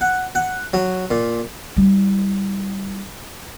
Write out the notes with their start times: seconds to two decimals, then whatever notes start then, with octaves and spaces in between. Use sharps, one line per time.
0.01 F#5
0.35 F#5
0.74 F#3
1.11 A#2
1.77 G3 E4